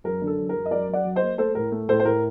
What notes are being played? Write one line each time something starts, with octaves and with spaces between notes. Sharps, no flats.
F#2 A#4
D3
A4
F#2
A#4
F#2
D#5
F#2 A#4 D5
F#2
D5 F#5
F#3
C5 D#5
A#3
A3 A4 C5
A2 A#4
A3
A2 A4 C5
C5
A2 A#4